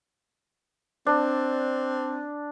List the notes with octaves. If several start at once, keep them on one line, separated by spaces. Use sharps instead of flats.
C4 D4